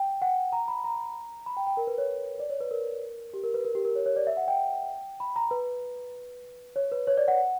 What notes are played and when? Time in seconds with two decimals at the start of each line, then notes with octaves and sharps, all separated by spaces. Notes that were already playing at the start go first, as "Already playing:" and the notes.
Already playing: G5
0.22 F#5
0.53 A#5
0.68 B5
0.84 A#5
1.46 B5
1.57 G5
1.67 G5
1.77 A#4
1.87 B4
1.98 C#5
2.40 D5
2.50 C#5
2.61 B4
2.71 A#4
3.34 G4
3.43 A#4
3.54 B4
3.65 A#4
3.75 G4
3.85 A#4
3.95 C#5
4.06 C#5
4.16 D5
4.27 E5
4.37 F#5
4.48 G5
5.20 B5
5.36 A#5
5.51 B4
6.76 C#5
6.92 B4
7.07 C#5
7.17 D5
7.28 F#5